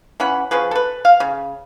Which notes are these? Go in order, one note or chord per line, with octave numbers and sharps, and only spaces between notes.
E3 C#4 F#5 B5
F3 C#4 G#4 B4
A4 B4
F5
C#3